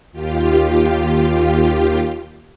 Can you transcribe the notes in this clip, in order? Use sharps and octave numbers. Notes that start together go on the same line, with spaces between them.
D#2 F4 G4